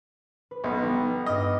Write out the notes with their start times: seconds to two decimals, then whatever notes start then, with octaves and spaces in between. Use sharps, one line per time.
0.51 B4
0.64 B1 B3
0.82 G3 D#4 A#5
1.26 G2 D#5 D6 F6